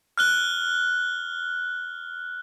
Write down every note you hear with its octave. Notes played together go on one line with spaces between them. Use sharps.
F6 F#6 G7